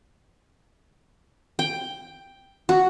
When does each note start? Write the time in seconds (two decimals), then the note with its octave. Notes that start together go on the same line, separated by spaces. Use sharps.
1.59 G5
2.69 F#4